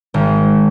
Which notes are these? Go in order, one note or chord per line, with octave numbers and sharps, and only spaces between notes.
G#1